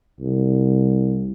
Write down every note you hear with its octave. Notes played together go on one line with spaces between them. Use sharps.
C2